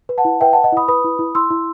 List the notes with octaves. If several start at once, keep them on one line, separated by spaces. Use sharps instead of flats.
B4
F#5 A5
E4
B4 E5 G5
B4 F#5 A5
D#5 F#5
E4 B5 D#6
B4 B5 D#6
E4
E4
E4 C6 E6
E4